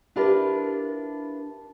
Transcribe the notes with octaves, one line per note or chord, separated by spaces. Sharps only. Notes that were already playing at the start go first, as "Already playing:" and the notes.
D4 E4 F4 G4 A#4 B4